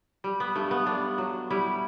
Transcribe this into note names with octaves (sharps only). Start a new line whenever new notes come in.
G3
B3
G2 A3
B3
G2 D4
F#3
G3 E4